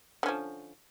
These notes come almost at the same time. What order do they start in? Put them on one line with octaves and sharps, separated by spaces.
D3 C#4 F3